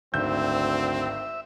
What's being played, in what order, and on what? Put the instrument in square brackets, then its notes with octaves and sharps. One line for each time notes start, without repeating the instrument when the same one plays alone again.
[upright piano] G#1 G6 [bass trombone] D2 [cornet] C4 [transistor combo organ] E5